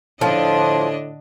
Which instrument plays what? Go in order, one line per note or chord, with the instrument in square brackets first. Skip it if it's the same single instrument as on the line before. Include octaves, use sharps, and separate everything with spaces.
[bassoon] A2 [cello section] D3 D4 D#5 [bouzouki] F3